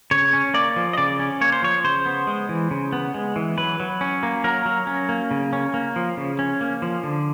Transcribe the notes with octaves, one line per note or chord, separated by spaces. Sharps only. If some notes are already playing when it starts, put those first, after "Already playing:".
C#3 C#5
C#4
A#3 D5
F3
D#5
C#3 D5
C#4
A#3 C#5
C5
F3 C#5
C#3 C5
B3
G#3
E3
C#3
B3
G#3
E3
F#3 B4
F#3
C#4
A#3
F#3 A#4
F#3
C#4
A#3
C#3
C#4
A#3
F3
C#3
C#4
A#3
F3
D3